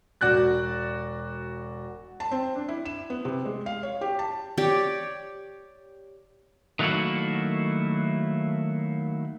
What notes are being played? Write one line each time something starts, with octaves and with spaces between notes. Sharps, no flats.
E1 F#4 D5 F#6 A6
A5
C4
D4
E4
E7
B3
C3
G#3
F5
C#5
G4
A5
G4 C#5 D5
D#3 F#3 A3 A#3 E4 F#4